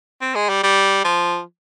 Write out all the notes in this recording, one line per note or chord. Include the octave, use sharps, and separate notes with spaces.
C4
G#3
G3
G3
F3